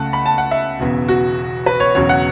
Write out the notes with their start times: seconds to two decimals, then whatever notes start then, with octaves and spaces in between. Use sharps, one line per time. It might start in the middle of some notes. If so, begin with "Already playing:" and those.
Already playing: C#2 C#3 A3 F#5 A5
0.13 B5
0.26 A5
0.38 F#5
0.51 E5
0.79 E1 E2 C#3
1.08 F#4
1.66 B4
1.80 C#5
1.95 E1 E2 C#3 F#3 C#5
2.09 F#5